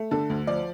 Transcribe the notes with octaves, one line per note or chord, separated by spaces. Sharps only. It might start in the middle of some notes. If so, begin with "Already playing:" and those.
Already playing: A3
D3 A4
D2
F3 D5